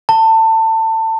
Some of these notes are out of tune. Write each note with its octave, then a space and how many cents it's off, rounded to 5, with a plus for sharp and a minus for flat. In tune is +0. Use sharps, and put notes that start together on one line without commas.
A5 +25